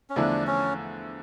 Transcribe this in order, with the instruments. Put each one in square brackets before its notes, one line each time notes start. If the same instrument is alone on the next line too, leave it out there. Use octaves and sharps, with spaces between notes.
[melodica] C#4
[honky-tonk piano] E2 D3 F3 A3 E4 [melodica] D4
[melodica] C#4